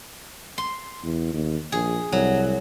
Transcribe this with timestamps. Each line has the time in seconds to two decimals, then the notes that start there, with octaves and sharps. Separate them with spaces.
0.58 C6
1.03 E2
1.33 D#2
1.72 A#1 G#4
2.12 C2 F#3